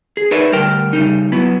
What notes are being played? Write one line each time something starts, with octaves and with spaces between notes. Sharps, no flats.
G#4
D#4 A#4 B4 C#5 D5 E5
D2 G3 A#4 G5
C#3 G3 D#4
F#3 B3 E4